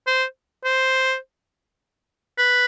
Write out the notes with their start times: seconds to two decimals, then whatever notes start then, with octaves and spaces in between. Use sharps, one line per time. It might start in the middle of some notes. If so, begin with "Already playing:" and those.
0.07 C5
0.64 C5
2.38 B4